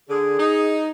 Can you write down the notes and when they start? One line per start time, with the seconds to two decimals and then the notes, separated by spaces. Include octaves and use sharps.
0.10 D3 G#4
0.39 D#4